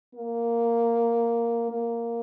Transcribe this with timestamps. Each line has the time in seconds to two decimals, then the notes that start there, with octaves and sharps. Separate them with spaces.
0.14 A#3
1.70 A#3